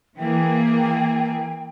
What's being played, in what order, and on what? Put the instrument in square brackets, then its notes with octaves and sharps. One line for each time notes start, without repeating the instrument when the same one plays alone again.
[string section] E3 A#3 G#4 [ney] G5